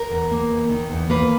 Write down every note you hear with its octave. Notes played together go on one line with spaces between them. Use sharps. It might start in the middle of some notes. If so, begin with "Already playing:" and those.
Already playing: A#4
E2
A#3
E2
D#3
E2
A#3 B4